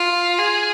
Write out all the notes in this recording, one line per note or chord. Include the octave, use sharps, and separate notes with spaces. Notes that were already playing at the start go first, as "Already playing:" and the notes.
Already playing: F4
G#4